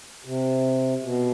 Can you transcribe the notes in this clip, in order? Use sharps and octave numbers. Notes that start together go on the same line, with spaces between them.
C3
B2